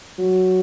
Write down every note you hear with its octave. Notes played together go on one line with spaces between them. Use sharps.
F#3